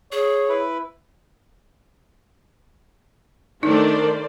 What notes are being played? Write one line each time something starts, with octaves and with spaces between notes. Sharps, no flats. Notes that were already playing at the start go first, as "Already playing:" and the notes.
G#4 C#5
E4 B4
D#3 A3 D4 D#4 A#4 C5 D5